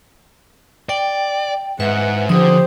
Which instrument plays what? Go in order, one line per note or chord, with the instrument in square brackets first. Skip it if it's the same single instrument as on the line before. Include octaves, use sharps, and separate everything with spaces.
[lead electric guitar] D5 [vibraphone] G5
[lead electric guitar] G#2 [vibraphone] B4 E5 [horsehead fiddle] F#5
[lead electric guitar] D3 [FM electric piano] F3 [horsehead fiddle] G4 C5 [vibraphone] D#6